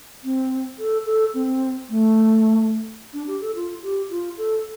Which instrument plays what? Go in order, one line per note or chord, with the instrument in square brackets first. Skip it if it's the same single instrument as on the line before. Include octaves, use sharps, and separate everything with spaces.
[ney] C4
A4
A4
C4
A3
D4
G4
A4
F4
G4
F4
A4